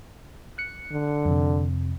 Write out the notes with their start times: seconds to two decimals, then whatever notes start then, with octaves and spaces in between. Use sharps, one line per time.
0.58 F#6 C#7
0.92 D3
1.25 F2 C3